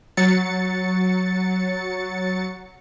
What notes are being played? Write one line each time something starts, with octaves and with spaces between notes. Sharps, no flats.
F#3 A6 C#7